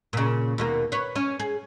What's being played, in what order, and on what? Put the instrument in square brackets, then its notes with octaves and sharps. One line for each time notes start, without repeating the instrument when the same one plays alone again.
[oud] A#2 C#3
D#2 B2 A#3
B4 C#5
C#4
G#4